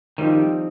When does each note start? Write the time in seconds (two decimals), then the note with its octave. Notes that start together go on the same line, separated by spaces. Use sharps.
0.18 D#3 F3 G3 C4 D#4 G4